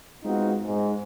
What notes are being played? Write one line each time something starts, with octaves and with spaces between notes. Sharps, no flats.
G#3 B3 C4 D#4 F4 F#4
G#2